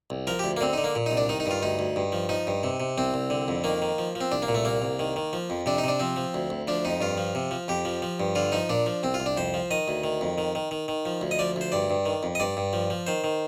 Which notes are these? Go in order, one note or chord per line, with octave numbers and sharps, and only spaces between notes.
C2
F3 A#4
D2 G4
A#3
D3 C4
D3 D#4
A#3
A#2
D#4
C2
D4
D#3 D#4
D#4
G2 F4
D2 D#4
D2
G2
F3
F3 D#4
G2
C3
C3
C2 C4
C2
D3
F2
D#3 A#3
D#3
F3
F3
C4
C2 D4
A#3
A#2
A3
C2 A#3
C2
D#3
D#3
F3
F2
C3 D4
D#4
C3 D4
F3 C4
F3
D2
D2
F3 D4
F2 D#4
G2 F4
F3
C3
F3
F2 G4
F3
F3
G2
D3 F4
F3 D#4
A#2 D4
F3
C2 C4
F4
C2
D4
F2 C5
F3
D#3 D#5
D2
D#3
F2
D#3
D#3
D#3
D#3
F3
D2
D#5
F3 D5
D2 C5
G2 D5
G2
D#3
F2
D#5
G2 D5
G2
F3
F3
D#3 C5
D#3